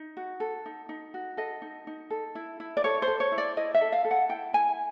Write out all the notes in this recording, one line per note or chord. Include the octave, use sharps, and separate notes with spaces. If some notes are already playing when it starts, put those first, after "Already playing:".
Already playing: D#4
F#4
A4
D#4
D#4
F#4
A4 D#5
D#4
D#4
A4
E4
E4
D5
A4 C#5
C5
A4
C#5
E4
D5
E4 D#5
E5
A4
F5
A4
F#5
E4 G5
E4 G#5